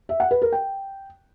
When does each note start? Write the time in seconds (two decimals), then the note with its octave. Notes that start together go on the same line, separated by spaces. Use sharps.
0.09 E5
0.20 F#5
0.31 B4
0.42 A#4
0.53 G5